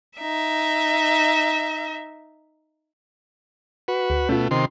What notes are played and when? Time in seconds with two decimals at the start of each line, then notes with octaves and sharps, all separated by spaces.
0.19 D#4 E5
3.88 F#4 B4
4.10 D2
4.29 B2 A3 C#4 F4
4.51 C3 D#3 C6